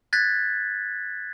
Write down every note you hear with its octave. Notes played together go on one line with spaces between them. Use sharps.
F#6 G#6 A6 B6